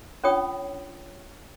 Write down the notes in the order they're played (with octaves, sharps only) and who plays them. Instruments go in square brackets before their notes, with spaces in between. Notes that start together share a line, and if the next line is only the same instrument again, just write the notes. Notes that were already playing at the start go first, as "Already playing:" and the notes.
[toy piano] C#4 D4 F4 C#5 G5 D#6